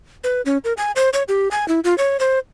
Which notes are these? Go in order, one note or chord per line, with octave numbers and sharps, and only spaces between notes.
B4
C#4
A#4
G#5
C5
C#5
G4
G#5
E4
F4
C#5
C5